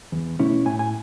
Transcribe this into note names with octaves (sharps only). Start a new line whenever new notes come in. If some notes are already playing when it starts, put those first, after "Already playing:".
E2
B2 A3 C#4 E4
A2 G#5
G#5